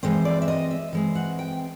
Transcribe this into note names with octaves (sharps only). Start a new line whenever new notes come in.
E3 G#3 C4 C5
D5
E5
D#5
E5
E3 G#3 C4
F#5
G5